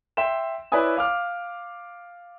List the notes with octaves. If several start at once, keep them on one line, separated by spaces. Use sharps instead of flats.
E5 G5 C6 E7
E4 B4 C#5 D5 G#5 D#6
F5 D6 F6